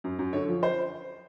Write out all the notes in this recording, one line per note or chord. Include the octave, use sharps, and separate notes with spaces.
F#2
F#2
D3 C#5
F3
C5